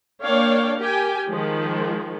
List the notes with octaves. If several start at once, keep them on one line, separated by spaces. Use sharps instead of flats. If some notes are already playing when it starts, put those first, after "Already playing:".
A#3 D4 C#5 F5 G5
G4 A#4 G5 G#5
D#3 F3 G#3